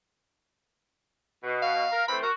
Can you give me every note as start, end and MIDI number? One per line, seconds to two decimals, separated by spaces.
1.43 1.85 47
1.62 2.05 77
1.91 2.04 70
2.08 2.20 52
2.08 2.20 57
2.08 2.20 60
2.08 2.18 83
2.23 2.33 66
2.23 2.31 70